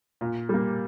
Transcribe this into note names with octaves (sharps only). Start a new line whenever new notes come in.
A#2
G3 A#3